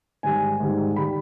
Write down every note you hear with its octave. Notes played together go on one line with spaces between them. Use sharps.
G#2 D#3 G3 G#5
G#2 D#3 G3
D#3 G3 B5